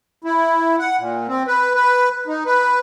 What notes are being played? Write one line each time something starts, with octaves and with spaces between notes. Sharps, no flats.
E4
F#5
A#2
C4
B4
B4
D#4
B4